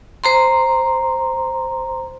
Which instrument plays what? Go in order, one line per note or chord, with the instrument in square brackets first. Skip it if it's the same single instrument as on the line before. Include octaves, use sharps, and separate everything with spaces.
[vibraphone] C5 A#5 C6